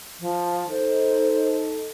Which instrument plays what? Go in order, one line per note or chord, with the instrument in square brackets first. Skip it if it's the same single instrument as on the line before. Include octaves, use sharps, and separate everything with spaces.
[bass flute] F3
[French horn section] D#4 A4 [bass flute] C5